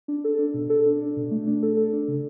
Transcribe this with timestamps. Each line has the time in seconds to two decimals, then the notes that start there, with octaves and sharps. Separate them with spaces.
0.08 D4
0.24 A4
0.39 D4
0.54 B2
0.70 A4
0.86 D4
1.01 D4
1.17 B2
1.31 A3
1.47 D4
1.63 A4
1.77 A4
1.93 D4
2.08 C#3